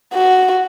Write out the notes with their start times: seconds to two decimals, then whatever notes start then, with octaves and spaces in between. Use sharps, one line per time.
0.14 F#4